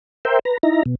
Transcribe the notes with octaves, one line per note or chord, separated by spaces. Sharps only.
A#4 C5 E5 G5
B4 A#5
D#4 E4 A#5
B2